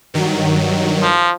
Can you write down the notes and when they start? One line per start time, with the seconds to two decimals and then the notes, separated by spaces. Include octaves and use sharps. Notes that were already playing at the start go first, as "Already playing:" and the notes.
0.14 G2 D#3 F#3
1.02 F3